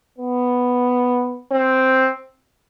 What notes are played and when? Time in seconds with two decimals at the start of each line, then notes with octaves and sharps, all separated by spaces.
0.18 B3
1.52 C4